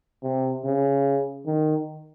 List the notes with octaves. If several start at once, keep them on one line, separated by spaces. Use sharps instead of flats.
C3
C#3
D#3